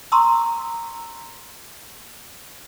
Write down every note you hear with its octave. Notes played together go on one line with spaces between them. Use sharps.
A#5 C6 C#6 D#6 E6